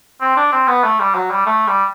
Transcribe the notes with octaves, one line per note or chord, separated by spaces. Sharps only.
C4
D4
C4
B3
A3
G3
F#3
G3
A3
G3